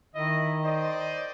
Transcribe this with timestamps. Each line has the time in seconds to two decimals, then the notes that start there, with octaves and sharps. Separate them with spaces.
0.15 D#3 E4 D#5
0.64 C5 D5 D#5